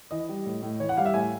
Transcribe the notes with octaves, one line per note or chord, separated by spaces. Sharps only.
E3 D#5
G3
A2
A2
E3 C#5
F#5
G3 F5
E5
A2 G#5